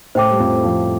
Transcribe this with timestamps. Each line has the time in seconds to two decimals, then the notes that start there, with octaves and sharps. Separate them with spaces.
0.15 A2 A3 C5 G5 D6
0.31 G3
0.39 F2 F3
0.64 F2 F3